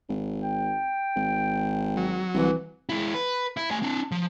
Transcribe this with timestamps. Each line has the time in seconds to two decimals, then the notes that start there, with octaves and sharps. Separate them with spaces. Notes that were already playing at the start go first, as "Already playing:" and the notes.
0.09 G#1
0.42 G5
1.16 G#1
1.97 F#3
2.34 C2 E3
2.89 G#3 E4
3.14 B4
3.57 E4
3.71 A3 G#5
3.82 C4 D4
4.11 F3